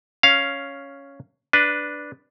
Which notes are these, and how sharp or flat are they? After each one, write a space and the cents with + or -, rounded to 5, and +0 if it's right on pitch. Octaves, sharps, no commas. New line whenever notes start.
C#4 +0 F5 +0
D4 +0 B4 +0